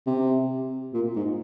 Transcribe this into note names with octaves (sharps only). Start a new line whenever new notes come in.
C3
A#2
G#2